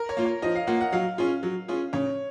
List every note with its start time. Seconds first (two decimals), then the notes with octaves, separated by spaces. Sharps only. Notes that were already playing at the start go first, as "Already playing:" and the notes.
Already playing: A#4
0.09 C#5
0.17 A#3 F4
0.25 C#5
0.42 F3 D#5
0.55 F5
0.67 A#3 F4 F#5
0.81 F#5
0.92 F#3 F5
1.18 C#4 F4 G#4
1.43 F#3
1.68 C#4 F4 G#4
1.93 C#3 C#5